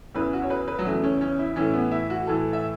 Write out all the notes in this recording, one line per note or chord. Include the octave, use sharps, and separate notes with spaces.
E2 C#3 E3 B4
F#4
C#5
B4
B4
F#3
E2 C#3 E3 A3
C#4
C#4
E4
A2 E3 C#4
B3
E4
F#4
A2 E3 A4
E5